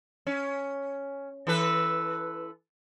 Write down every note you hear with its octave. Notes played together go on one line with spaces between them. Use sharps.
C#4
E3 A4 B4